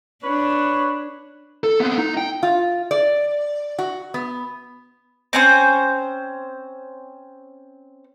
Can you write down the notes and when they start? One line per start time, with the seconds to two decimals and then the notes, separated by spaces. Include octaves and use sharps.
0.24 D4 B4 C#5
1.64 A4
1.80 B3 C4
1.98 D#4
2.17 G5
2.43 F4
2.91 D5
3.79 F#4
4.14 B3
5.33 C4 C#4 C5